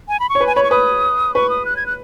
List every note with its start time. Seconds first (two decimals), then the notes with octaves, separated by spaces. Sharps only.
0.08 G#5
0.20 B5
0.29 C#6
0.35 C#5
0.41 B4
0.47 G#5
0.55 C#5 B5
0.63 C#6
0.71 B4 D#6
1.34 B4 C#6
1.50 D#6
1.65 F#6
1.77 G#6
1.86 F#6